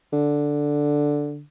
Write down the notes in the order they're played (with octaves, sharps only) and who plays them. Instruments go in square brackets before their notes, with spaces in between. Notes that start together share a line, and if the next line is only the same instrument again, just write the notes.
[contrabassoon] D3